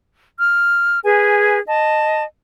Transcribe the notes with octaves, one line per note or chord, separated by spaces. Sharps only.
F6
G#4 B4 G#5
D#5 A5